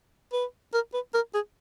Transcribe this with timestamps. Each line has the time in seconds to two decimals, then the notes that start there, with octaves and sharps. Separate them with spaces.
0.33 B4
0.73 A#4
0.94 B4
1.14 A#4
1.34 G#4